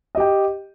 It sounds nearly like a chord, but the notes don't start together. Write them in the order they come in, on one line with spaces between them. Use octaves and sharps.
D#5 G4 G5